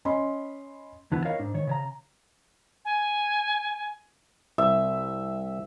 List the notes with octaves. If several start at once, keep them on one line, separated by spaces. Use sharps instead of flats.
C#4 D#5 B5 C6
E2 D3 B3 E4
E4 A#4 C#5 D#5 F5
G#2 D4
D#3 C#5
C#3 C#5 A#5
G#5
C2 E5